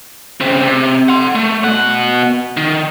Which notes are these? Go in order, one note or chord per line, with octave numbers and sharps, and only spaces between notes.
C#3 C4
C3
F#5 C6
A3
B2 F#5
D#3